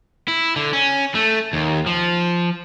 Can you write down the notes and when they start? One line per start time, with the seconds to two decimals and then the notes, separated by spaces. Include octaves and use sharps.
0.28 E4
0.56 D3
0.73 C#4
1.15 A3
1.53 D#2
1.86 F3